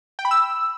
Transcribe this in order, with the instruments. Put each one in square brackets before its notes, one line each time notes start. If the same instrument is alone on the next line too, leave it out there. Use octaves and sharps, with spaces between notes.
[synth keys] G5
B5
E6